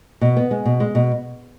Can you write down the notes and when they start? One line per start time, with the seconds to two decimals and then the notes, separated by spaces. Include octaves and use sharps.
0.21 B2
0.37 B3
0.51 G#3
0.66 B2
0.80 G#3
0.95 B2